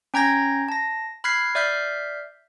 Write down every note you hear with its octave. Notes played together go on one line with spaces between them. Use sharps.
C#4 G5 A#5 G6 G#6 A#6
A5 A#6
B5 F6 F#6 G#6 B6 C7
D5 E5 F6 G6 B6 C7